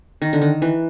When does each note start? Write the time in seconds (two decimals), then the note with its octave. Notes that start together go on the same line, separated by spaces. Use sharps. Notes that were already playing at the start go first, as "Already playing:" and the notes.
0.22 D#3
0.33 D3
0.41 D#3
0.62 E3